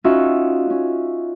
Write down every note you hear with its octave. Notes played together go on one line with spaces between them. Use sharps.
C#4 D#4 F4 F#4 E5
C#4